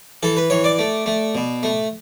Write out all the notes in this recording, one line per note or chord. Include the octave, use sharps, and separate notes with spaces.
E3 A4
B4
E3 C#5
D5
A3
A3
B2
A3